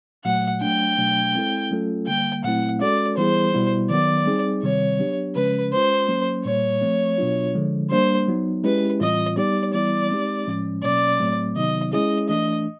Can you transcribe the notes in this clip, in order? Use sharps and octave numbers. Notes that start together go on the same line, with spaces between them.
A#2 F#3 A3 F#5
F#3 A3 D4 G5
B2 F#3 A3 D4
G#3 C4 E4 A4
F#3 A3 C#4 F4 A4
D3 G3 A#3 G5
A#2 F#3 A3 C4 E4 F#5
G#3 C#4 F#4 A4 D5
E3 G3 B3 E4 G#4 C5
B2 G3 B3 E4
D#3 F#3 B3 D5
G3 C4 D#4 G#4
C3 D#3 G3 C4 C#5
F#3 B3 D4 G4
C#3 F3 G#3 C#4 B4
G#3 C#4 F4 C5
F#3 A#3 C#4
A#2 G3 A#3 C#5
F3 A3 C4
B2 F#3 B3 D4 F4
D3 F3 G#3
G3 A#3 D4 C5
F#3 B3 D#4
G#3 C#4 E4 G4 B4
A2 E3 G3 C4 F4 D#5
G3 B3 D#4 G4 D5
E3 G3 B3 E4 D5
G#3 C4 D#4 G4
A2 F3 G#3 C#4
B2 F#3 A#3 C#4 D5
A2 F#3 A3 C4
C3 D#3 F#3 B3 D#4 D#5
G#3 C#4 E4 G#4 D#5
E3 A3 D4 D#5